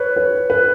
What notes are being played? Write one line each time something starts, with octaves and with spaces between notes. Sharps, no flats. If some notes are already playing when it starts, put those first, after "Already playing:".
Already playing: B4 C#5
B4
B4